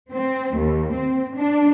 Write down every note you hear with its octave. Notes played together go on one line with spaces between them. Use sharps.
C4
D#2
C4
D4